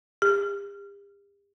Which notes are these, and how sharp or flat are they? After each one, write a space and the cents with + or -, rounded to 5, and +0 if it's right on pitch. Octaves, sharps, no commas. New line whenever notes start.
G4 +45